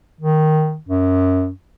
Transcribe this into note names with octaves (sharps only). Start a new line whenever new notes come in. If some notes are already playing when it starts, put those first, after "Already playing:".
D#3
F#2